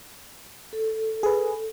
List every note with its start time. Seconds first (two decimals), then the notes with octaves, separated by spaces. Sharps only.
0.73 A4
1.23 G#4 B4